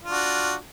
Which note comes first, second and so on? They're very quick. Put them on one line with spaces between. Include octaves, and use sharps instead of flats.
F4 D4 F#4